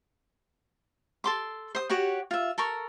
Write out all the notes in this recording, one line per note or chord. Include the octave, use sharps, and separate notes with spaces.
A4 C6 D6
C5 D#6
F#4 G4 C#5 F#5
F4 E5
A4 A#4 C#6